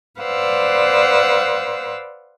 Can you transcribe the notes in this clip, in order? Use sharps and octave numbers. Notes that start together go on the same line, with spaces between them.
B4 C5 D5 F5 F#5 E6